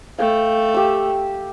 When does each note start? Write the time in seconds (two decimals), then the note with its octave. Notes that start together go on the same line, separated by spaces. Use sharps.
0.19 A3 F5 G5
0.74 G4 E6